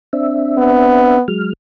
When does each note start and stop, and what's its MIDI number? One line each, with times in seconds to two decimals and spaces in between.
0.13 1.19 60
0.13 1.19 62
0.13 1.19 76
0.58 1.21 59
1.28 1.53 54
1.28 1.53 56
1.28 1.53 89